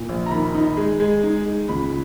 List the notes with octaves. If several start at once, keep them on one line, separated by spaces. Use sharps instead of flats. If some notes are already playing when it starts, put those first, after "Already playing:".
Already playing: A#2
A#1
A#5
D#3 B5
D#4
G#3
G#3
D#4
G#3
C#2 B5